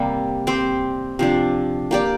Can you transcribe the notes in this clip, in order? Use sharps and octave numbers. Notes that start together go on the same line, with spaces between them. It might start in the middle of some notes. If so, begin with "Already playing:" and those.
Already playing: C3 G3 A#3
C4 G4 C5
C3 F3 D4
A#3 G4 D5